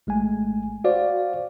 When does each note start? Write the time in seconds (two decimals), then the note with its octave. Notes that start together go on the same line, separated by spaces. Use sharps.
0.07 G#1 G#3 A3 G#5
0.84 F#4 C5 D5 F5